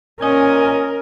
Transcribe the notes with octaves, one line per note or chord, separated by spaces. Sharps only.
A#2 C#4 A#4 D#5 G#5